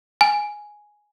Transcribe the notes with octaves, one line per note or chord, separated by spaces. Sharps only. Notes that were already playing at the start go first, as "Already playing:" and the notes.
G#5